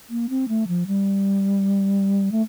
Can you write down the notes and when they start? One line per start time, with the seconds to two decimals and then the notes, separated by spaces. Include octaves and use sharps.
0.10 A#3
0.29 C4
0.48 A3
0.68 F3
0.87 G3
2.32 A3